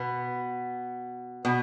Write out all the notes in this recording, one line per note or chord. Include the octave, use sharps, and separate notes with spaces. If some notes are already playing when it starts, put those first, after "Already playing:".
Already playing: B2 B3
B2 B3